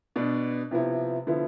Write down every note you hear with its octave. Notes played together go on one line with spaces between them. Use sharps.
B2 B3 D4
C3 F3 B3 E4
D3 F3 B3 E4